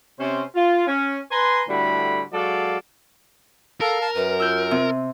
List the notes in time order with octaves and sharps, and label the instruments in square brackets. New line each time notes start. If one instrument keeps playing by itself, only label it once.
[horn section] C3 C#4 C5
F4
C#4
B4 G#5 A#5 C6
A2 D3 G3 F#4 B5
F#3 G#3 F#4 A4 D5 F5
[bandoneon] A4 [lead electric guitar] A#4 [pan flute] F5
[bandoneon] A5 F6
[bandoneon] F#2 [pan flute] B4
[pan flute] F4 [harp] E6 G6
[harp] C3